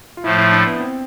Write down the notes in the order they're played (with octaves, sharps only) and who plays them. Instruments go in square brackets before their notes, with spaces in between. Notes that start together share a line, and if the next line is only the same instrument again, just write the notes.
[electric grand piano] F4
[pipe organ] A2 F3 A3 [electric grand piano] E4
[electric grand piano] E4
D4
B3
C4